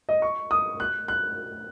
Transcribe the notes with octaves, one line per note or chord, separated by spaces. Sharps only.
D#5
C#6
D#6
F#6
F#6